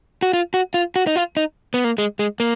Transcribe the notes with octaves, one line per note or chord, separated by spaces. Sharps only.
F#4
F4
F#4
F4
F#4
D#4
F4
D#4
B3
A#3
G#3
G#3
A#3